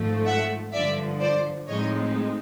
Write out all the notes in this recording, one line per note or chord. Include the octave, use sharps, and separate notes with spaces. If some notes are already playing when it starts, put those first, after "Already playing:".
Already playing: G#1 G#2 F3 A3
E5 F#5
G2 D3 F3 D5 E5
C5 D5
A2 F3 G#3 C4 D#4 C#5 D#5